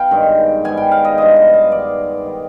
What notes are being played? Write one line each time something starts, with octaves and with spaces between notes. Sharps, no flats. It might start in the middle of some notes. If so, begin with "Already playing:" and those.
Already playing: B3 F5 G5
G2 D#3 G#3
G#2 G3 B3 G#5
G5
F5
D#5
G2 F3 G#3 D#5
D#5
F5
G2 D#3 G#3 D5
D#3 G3